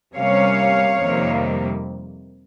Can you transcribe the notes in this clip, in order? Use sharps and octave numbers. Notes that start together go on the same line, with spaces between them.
C3 G3 A#3 C#4 C#5 F5
F2 C3 D#3 G3 A#3